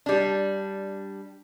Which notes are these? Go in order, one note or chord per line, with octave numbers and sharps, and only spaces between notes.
G3 D4